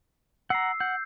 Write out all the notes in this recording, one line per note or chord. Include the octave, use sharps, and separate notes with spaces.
F#5 A#5 E6 C7
F#5 G6